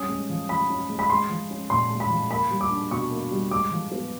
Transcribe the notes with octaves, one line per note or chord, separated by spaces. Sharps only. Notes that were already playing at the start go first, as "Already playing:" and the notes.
Already playing: G3 C#4 D#6
G#3
F3
F3 B5
C#4
G#3
B5
G#3 C6
F3
C#4
A#2 C6
G#3
B5
F3
A#3 B5
G3
D6
D4
B2 C#6
A#3
G3
G#3 D6
F3
B3